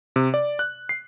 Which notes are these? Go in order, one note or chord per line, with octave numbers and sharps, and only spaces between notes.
C3
D5
F#6
C7